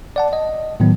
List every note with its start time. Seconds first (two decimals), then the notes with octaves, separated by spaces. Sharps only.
0.16 D5 F#5 A5
0.33 D#5
0.80 A2 D#3 F#3 B3